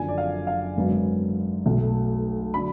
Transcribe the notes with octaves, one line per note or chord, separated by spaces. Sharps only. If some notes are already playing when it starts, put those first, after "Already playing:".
Already playing: F#1 F#2 D3 F3 G#5
D5
F5
F5
G#1 F#2 D3 F#3 B3
B1 B2 A3
D3 F#3 B5